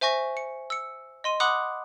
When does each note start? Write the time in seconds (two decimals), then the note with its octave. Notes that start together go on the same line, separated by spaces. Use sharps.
0.01 C5 E5 G#5 C#6 A#6
0.37 C#7
0.70 E6 C#7
1.24 D#5 C6 D#7
1.40 F#5 B5 C6 D6 D#6 F#6